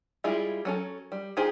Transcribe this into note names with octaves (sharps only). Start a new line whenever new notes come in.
G3 G#3 E4 F4 G#4
F#3 C#4 A4
G3
D#4 F4 G4 G#4 C5